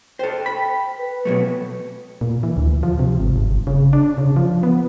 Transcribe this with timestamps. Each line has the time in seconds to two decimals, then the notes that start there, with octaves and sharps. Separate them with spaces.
0.19 A4 C5 G5
0.46 B5
0.98 B4
1.25 B2 F#3 A3
2.21 A#2
2.43 E3
2.57 D2
2.83 F3
2.99 C3
3.20 G#1
3.36 G1
3.67 C#3
3.93 D4
4.18 C#3
4.36 F3
4.63 B3